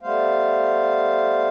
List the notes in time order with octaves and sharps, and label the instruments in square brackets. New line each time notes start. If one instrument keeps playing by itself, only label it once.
[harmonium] G3 A3 B3 C5 F5